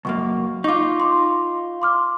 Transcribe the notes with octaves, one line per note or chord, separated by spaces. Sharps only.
C#2 F#2 A#3 C#6
D#4 F4 C#6 D6
C6 D6
C6 D6 F6